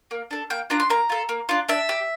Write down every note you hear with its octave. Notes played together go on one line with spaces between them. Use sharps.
A#3
D4 A4
A#3 G5
D4 F4 A#5
C6
A#3 A#5
F4 A4
A#3
D4 F4
D4 E5
G4